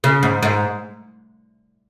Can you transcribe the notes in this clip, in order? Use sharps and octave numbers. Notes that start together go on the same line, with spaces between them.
C#3
G#2
G#2